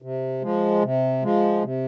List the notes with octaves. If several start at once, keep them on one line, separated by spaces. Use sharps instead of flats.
C3
F3 G#3
C3
F3 G#3
C3